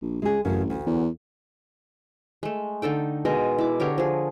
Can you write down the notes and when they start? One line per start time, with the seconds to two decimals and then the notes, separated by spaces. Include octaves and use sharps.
0.02 A#1
0.22 C#2 G#3 G#4
0.45 A1 F#2 C#3
0.70 D2
0.87 E2
2.43 G#3 A3
2.82 D3 D#4 A4 G5
3.25 B2 G#3 A#4 D#5
3.58 E4 D6
3.80 D3 G4 A#4 C#5
3.98 F3 G#4